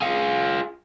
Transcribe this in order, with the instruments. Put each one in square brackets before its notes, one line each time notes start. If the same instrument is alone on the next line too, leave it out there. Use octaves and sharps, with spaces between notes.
[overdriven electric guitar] F4 G#4